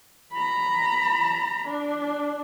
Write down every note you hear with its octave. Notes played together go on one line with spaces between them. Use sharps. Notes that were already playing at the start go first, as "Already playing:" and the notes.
A#5 B5
D4